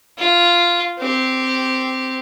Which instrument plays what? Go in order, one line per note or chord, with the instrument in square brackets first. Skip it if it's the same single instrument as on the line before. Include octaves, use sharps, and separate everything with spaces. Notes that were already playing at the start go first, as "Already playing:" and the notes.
[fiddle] F4
C4 G4